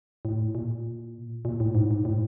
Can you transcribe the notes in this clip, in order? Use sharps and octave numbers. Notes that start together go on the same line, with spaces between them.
A2
A#2
A#2
A2
G#2
G#2
A2